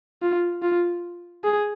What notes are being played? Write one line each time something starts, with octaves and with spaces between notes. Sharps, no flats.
F4
F4
G#4